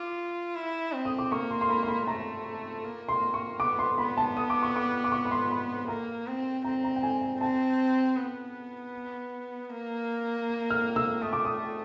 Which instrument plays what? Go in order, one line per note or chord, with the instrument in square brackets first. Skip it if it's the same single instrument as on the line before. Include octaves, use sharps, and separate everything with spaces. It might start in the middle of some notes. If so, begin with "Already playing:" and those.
Already playing: [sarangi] F4 [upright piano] D6
[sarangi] E4
C4
[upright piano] D#6
D6
[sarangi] A#3 [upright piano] C#6
[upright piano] C6
C6
B5
C6
B5
[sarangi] A3 [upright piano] A#5
[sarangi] A#3
[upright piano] C6
C#6
[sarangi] B3 [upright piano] D6
[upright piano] C6
[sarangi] B3 [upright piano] B5
[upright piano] A5
D#6
D6
C#6
D6
D6
C#6
B5
C6
B5
[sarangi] A#3 [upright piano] A#5
[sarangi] C4
[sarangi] C4 [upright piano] A#5
[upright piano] A#5
G5
G#5
G#5
[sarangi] C4 [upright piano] A5
[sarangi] B3
A#3
[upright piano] F6
E6
[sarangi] A3 [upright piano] D#6
[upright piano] D6
D#6